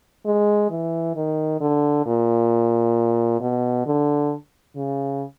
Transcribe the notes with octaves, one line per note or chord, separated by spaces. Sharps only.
G#3
E3
D#3
D3
A#2
B2
D3
C#3